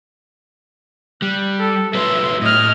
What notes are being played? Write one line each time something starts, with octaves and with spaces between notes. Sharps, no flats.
G3 F#6
A4
F#3 A3 B4 E5 C6
A2 D#5 F6